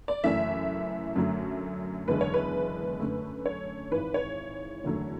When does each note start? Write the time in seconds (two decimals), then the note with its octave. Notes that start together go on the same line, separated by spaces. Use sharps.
0.08 D5
0.24 F#1 F#2 E3 A3 E5
1.16 F#2 D3 F#3 A3
2.08 F#1 E2 D3 G#3 B4
2.21 C#5
2.34 B4
3.00 F#2 D3 A3
3.46 C#5
3.92 G#1 G#2 E3 B4
4.14 C#5
4.84 F#1 E2 D3 F#3 A3